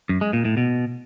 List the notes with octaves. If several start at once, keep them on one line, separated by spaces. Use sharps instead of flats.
F#2
G#3
A#2
A2
B2